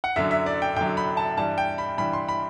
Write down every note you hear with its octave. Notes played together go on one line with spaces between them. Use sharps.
F#5
F#2 D3 F#3 E5
E5
D5
G5
F#2 D3 F#3 G5
B5
A5
G2 E3 G3 A5
G5
B5
G2 E3 G3 B5
C6
B5